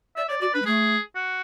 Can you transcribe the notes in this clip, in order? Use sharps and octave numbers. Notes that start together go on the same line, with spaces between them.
D5 E5
C#5 D5
F#4 D5
D4 B4
G#3
A3 G#4
F#4